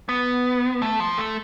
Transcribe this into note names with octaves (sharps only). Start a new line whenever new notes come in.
B3
A3
F3
A3